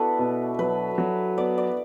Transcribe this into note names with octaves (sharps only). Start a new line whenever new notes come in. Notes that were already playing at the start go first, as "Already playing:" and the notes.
Already playing: B3 D4 E4 F#4 A4 B4
B2
F#3 B4
F#3
B3 D5
D5